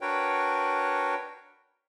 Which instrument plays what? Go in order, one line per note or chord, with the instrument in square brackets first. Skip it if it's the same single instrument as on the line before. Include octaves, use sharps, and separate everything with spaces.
[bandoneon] D4 F#4 A#4 B4 C#5 G5